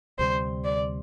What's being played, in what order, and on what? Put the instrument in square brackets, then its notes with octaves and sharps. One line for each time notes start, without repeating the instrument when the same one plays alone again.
[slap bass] D2 C3 G3 [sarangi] C5
[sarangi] D5